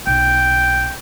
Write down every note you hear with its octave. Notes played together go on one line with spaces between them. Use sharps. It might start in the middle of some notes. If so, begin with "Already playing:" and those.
B1 G5